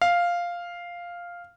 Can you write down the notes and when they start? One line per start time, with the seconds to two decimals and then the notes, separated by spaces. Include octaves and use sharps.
0.02 F5